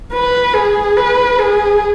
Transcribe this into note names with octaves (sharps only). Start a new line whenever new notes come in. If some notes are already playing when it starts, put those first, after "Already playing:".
B4
G#4
B4
G#4